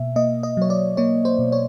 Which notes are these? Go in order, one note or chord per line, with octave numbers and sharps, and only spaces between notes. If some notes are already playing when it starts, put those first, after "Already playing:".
Already playing: B2 A#3 E5
A#3 D#5
D#5
F#3 C#5
D5
A#3 C#5
C5
B2
C#5